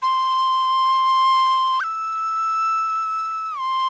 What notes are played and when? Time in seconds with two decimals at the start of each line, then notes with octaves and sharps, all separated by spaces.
0.02 C6
1.80 G6
1.84 E6
3.59 C6